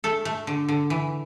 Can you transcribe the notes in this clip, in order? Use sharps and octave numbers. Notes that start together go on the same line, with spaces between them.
A3 A4
A3
D3
D3
E3